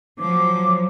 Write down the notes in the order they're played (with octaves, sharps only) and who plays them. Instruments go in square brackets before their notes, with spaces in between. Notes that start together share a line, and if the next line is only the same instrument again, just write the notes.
[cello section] F3 F#3 [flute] D6